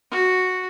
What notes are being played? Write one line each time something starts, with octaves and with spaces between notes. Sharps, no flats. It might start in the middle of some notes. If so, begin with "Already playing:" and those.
F#4